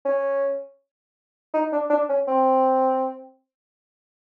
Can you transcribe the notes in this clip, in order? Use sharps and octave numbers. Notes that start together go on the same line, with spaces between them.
C#4
D#4
D4
D4
C#4
C4